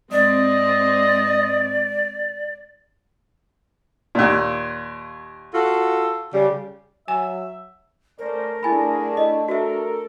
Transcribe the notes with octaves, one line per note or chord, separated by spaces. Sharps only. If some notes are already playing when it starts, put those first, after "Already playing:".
G#2 C4 D5 D#5
D#2 A#2
F4 F#4 A4
C#3 G3
F#3 E5 G#5
A3 C#4 A#4 C5 D5
D3 A3 D4 E4 G#4 G#5 B5
E4 D#5
F#4 A4 A#4 E5